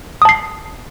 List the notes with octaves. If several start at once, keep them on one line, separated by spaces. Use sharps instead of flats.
A5 D#6 C7